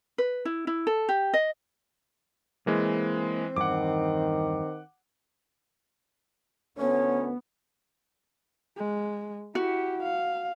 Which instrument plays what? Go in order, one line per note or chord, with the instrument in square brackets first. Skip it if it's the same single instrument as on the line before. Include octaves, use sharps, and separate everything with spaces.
[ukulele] B4
E4
E4
A4
G4
D#5
[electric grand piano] E3 G#3 [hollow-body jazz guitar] A#3 [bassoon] C4
[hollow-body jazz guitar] E2 G2 E3 [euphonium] D#3 [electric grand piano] F#5 D6
[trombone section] D2 A3 C#4 [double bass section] B3 [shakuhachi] C#5
[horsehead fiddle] G#3
[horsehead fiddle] E4 G4 [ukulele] F#4
[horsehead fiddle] F5